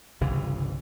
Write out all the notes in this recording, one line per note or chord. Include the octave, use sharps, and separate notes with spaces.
G1 C2 C#3 E3